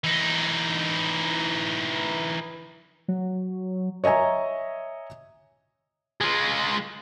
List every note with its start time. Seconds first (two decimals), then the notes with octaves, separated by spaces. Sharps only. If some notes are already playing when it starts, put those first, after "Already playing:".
0.04 E3 D#4
3.08 F#3
4.04 C#5 D#5 E5 G#5 A#5
6.21 G#3 F4